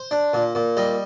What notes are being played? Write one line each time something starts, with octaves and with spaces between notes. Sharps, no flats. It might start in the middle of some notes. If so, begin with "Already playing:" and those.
Already playing: C5
D4
A#2
A#2
G3 D#5